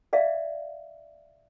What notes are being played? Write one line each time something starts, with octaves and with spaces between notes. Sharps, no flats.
D5 E5 F5